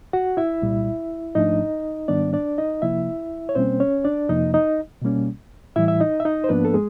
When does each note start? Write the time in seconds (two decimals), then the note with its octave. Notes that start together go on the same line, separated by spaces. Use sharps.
0.13 F#4 F#5
0.37 E4 E5
0.62 C2 A#2 G3
1.35 G#2 F3 A3 D4 D#4 D#5
2.08 G#2 D#3 G3 B3 D4 D5
2.33 D4 D5
2.58 D#4 D#5
2.82 C3 F3 A#3 E4 E5
3.49 C#5
3.55 B2 G3 A#3 C4 C#4 C5
3.80 C#4 C#5
4.04 D4 D5
4.29 F2 C3 F3 A#3 D#4 D#5
4.54 D#4 D#5
5.02 B2 G3 A#3 C#4
5.76 A2 E3 G3 E4 E5
5.88 E5
6.00 D#4 D#5
6.20 E5
6.25 D#4 D#5
6.44 C5
6.49 G#2 F3 A#3 B3 D4 B4
6.65 A4
6.74 G#3 G#4